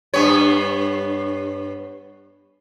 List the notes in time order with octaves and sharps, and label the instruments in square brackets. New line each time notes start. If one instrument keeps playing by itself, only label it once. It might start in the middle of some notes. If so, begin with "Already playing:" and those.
[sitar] G2 B3 C#5